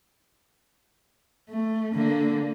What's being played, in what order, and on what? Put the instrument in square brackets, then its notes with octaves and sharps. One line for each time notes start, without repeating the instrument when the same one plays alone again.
[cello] A3
D3 A#3